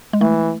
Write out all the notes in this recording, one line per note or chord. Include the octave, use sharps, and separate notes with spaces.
G#3
E3 A3